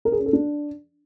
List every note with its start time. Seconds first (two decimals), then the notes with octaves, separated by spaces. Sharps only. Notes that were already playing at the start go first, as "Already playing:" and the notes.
0.05 A#4
0.12 G#4
0.19 C#4
0.26 A4
0.33 D4